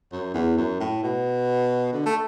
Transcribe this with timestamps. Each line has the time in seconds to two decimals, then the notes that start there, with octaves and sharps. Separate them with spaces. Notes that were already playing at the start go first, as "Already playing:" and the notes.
0.12 F#2
0.34 E2
0.57 F#2
0.80 A2
1.03 B2
1.93 D3
2.06 A3